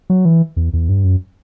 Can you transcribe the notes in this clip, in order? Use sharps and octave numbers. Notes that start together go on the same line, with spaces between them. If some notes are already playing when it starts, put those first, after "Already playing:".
F#3
E3
E2
E2
G2
F#2